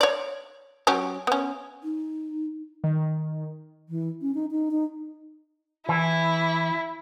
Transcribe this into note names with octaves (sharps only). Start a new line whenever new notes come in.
C#5 D5
F#3 C#4 G4
B3 C#4
D#4
D#3
E3
C#4
D#4
D#4
D#4
E3 E4